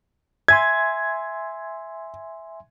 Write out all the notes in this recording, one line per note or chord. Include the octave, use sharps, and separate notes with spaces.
E5 G#5 C6 G#6